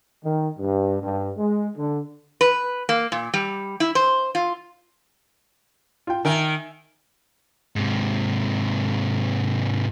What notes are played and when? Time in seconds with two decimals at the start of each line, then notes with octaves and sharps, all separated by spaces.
0.24 D#3
0.59 G2
1.02 G2
1.37 G#3
1.77 D3
2.41 B4
2.89 A#3
3.12 A#2
3.34 G3
3.80 E4
3.95 C5
4.35 F4
6.07 F4 G5
6.25 D#3 A#4 E5 G#5
7.76 G#2 C3